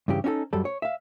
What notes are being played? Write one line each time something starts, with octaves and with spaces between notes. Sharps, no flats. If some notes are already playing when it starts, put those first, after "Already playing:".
G2 C#3 E3 G4
C#4 D#4 F#4 A4
F#2 G3 A4
C#5
E5 F5